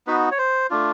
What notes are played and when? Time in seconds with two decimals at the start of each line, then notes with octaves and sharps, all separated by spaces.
0.07 B3 D#4 F#4 B4
0.31 C#5
0.38 C5
0.70 A3 D4 F4